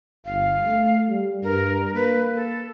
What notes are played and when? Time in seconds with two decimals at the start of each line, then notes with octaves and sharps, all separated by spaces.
0.25 G1 F5
0.65 A3
1.10 G3
1.43 G2 A#4
1.94 A#3 B4
2.34 A4